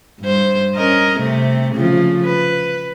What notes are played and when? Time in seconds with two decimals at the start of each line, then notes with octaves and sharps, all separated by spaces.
0.20 G2 C5
0.76 C#4 A#4 D#5
1.17 C3 A3 C4
1.75 C#3 F3
2.25 B4